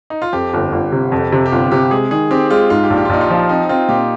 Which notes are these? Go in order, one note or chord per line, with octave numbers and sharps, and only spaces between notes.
D#4
F4
F2 G4
G1
G1
C3
F2
C3
G4
G1 F4
C3 G4
G#3 G#4
D#3 G#4
C4 G4
G#3 F4
G#2 F4
G4
A#1
G4
F4
A#1 D#4
F4
F3
C4 D#4
C4 F4
A#2 G4